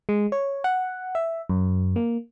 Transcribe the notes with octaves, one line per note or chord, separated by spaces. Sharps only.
G#3
C#5
F#5
E5
F#2
A#3